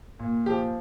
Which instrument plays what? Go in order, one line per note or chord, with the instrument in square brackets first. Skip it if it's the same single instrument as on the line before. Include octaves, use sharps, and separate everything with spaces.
[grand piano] A#2
[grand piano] F3 [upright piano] G4